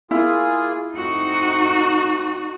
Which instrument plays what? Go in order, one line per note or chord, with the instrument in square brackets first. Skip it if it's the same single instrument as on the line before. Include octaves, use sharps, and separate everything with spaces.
[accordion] A#3 F4 G#4 [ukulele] E4
[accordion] A3 C4 [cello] D#4 F#4